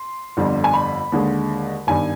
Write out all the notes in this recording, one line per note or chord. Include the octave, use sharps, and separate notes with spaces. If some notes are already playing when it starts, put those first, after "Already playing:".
Already playing: C6
G1 F2 D3 G3
G#5
B5
D#2 D3 G#3
G1 G2 D#3 G#5